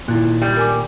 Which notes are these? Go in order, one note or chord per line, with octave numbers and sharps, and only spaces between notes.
A#2 D#3 E4 F#6
G3
A#4 G#5 D6